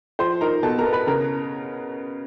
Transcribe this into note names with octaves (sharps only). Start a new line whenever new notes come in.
F3 C5 C6
D#4 A#4 A#5
B2 A4 A5
A#4 A#5
B3
B4 B5
C#3 A#4 A#5